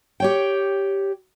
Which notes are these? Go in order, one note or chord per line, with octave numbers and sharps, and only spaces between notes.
G4 C#5 G5